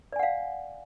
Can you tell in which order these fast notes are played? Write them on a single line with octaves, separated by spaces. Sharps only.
D5 G#5 F#5 F5